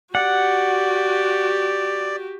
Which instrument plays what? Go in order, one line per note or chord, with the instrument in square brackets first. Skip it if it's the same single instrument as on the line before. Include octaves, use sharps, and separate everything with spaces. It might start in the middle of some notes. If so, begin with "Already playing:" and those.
[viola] F#4 G4 [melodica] D5 [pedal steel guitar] F#5